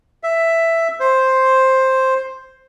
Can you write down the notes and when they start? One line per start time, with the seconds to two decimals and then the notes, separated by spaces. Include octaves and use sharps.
0.23 E5
1.00 C5